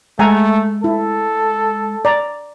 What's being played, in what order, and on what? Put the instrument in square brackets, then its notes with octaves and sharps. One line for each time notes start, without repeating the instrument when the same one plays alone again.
[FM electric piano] G#3 [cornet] A3 [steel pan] F#5 G#5 A#5
[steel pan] E4 [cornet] A4
[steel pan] D5 A#5